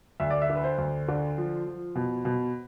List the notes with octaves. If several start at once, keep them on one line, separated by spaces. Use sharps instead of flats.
D2 E5
D5
E5
D3
B4
C5
D2
D3
F3
F3
B2
B2